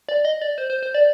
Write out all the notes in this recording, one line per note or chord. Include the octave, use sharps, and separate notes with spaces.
D5
D#5
D5
C5
C5
C5
D5